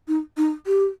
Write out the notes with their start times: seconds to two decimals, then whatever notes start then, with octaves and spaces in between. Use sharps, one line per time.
0.08 D#4
0.37 D#4
0.67 G4